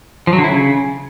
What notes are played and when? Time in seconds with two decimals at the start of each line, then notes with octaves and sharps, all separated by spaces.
0.27 F3
0.33 F#3
0.38 D3
0.44 E4
0.49 C#3